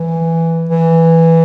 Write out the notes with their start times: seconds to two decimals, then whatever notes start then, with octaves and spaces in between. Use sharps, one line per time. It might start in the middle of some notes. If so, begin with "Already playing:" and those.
Already playing: E3
0.69 E3